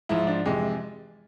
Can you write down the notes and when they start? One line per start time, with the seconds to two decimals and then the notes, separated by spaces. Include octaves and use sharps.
0.09 G#2 F3 E4
0.27 D4
0.45 F2 C3 E3 G#3